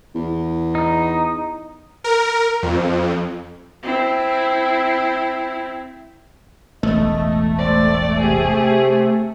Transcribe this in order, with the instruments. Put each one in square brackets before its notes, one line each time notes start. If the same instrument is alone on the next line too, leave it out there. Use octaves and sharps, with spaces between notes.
[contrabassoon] E2
[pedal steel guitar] D#4
[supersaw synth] A#4
F2
[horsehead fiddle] C4 E4
[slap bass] E1 A1 [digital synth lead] A3 [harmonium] D#5
[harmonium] C4 [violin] D5
[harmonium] C3 [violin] G4 G#4